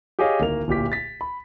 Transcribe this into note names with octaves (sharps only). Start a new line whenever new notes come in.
G4 G#4 C#5 D#5 F5
D1 D#3 A#3 F7
D1 A#2 G4 B6
A6 B6
B5